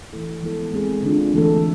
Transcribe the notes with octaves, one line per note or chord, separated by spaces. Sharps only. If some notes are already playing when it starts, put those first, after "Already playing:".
E3 A3 E4 A4
F3 G#3 B3 E4 A4
G#3 C4 G#4
D3 G#3 D4 F4
E3 A3 D4 A4